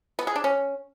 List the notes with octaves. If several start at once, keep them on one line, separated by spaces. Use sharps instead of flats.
B3
G#4
D4
C#4